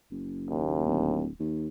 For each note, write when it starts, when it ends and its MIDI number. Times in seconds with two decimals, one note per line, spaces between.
0.11 0.84 30
0.50 1.22 39
0.85 1.28 26
1.39 1.68 39